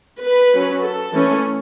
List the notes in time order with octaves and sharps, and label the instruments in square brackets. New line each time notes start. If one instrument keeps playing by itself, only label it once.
[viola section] B4
F#3 C#4
A4
E3 A3 C#4